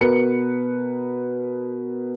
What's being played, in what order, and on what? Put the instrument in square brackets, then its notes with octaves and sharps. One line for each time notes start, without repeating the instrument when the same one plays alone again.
[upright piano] B2 A#4 B4 C#7